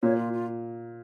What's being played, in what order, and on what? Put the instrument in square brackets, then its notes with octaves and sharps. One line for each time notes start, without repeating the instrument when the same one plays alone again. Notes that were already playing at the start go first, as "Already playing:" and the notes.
[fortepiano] A#2 [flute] C#5
[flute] F4
F4